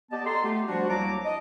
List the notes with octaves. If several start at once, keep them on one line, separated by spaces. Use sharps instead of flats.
B3 G4 D5 D#5 A5
G4 A4 A#5 C6
A3 B3 F4 G4
F3 G3 D4 F#4
C2 F#3 A#3 A5 A#5 D6
D#5